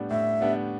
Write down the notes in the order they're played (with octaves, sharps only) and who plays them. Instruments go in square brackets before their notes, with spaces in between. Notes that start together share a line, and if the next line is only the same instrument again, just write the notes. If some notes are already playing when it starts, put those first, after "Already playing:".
Already playing: [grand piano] A2 G3 B3 D4
[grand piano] A2 [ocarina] E5
[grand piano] G3 B3 D4